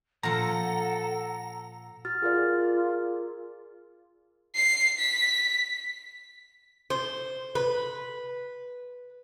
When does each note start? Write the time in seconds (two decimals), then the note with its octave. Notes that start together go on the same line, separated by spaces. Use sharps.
0.23 A#2 F3 A4 F#5 A#5
2.05 F#4 F6 A6
2.22 F4 G#4 A#4 D5
4.55 C7
4.99 B6
6.90 C5
7.55 B4